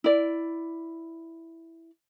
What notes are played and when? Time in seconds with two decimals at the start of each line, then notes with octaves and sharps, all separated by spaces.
0.04 E4 D5